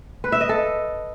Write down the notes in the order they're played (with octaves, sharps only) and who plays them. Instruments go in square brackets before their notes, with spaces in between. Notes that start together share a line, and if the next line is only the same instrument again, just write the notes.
[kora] B4
E5
D#5
A4